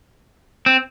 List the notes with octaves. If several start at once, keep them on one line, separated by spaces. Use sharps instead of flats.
C4